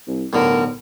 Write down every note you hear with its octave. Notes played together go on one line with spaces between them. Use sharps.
C2
B1 A2 D3 A#4